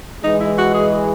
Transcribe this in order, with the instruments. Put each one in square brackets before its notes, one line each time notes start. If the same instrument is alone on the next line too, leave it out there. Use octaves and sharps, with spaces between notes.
[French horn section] E3 G#3 [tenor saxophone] D#4
[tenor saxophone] E4
F#4
G#4